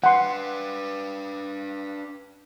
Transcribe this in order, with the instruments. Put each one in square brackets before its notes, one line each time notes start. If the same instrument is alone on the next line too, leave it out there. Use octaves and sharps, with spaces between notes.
[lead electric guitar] D4 B4 [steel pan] F#5 C6